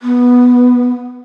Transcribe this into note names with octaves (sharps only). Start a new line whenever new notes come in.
B3